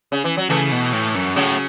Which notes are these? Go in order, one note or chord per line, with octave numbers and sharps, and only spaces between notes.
C#3
E3
F#3
C#3 E3 A3
B2
A2
F#2
A2 C#3 F#3